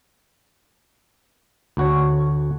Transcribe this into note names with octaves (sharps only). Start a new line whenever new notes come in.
D2 F#4 C#5